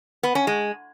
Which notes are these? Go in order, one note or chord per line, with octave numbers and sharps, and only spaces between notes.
B3
C#4
G#3